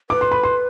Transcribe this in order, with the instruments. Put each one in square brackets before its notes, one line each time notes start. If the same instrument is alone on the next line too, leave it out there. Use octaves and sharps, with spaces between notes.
[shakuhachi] B4 [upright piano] D6
[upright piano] C6
B5
C6